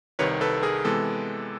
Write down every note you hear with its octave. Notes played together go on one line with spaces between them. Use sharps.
C2 C3 D#3 B4 C#5
A4 B4
G#4 A#4
C3 E3 G#3 B3 A4